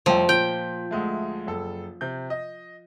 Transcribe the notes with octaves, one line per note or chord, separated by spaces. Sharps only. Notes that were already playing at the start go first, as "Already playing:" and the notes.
F1 C2 F3 G5
A#2 G5
D2 G#3 A3
F#1 A4
C3 G6
D#5